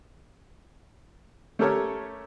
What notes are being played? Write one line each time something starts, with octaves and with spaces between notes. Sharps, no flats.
A3 C#4 G4 A4 A#4 C#5